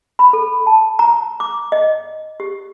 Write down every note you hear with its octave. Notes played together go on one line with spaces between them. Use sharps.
B5
A4
A5
A#5
D6
D#5
G4